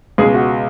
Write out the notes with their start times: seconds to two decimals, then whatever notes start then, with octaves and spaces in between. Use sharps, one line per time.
0.18 C#2 B2 G#3 G#4
0.35 F#4